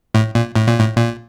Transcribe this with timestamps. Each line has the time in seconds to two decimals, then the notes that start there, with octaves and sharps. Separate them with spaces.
0.14 A2
0.35 A#2
0.56 A2
0.67 A#2
0.79 A2
0.97 A#2